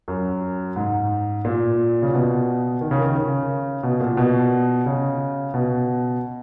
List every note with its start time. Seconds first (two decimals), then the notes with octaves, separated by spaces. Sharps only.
0.08 F#2
0.76 G#2
1.45 A#2
2.02 C#3
2.13 B2
2.81 D#3
2.91 C#3
3.01 D#3
3.15 C#3
3.83 B2
4.00 A#2
4.17 B2
4.86 C#3
5.54 B2